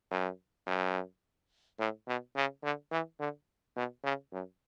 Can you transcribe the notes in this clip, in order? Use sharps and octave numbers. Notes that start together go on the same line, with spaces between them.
F#2
F#2
A2
B2
C#3
D3
E3
D3
B2
C#3
F#2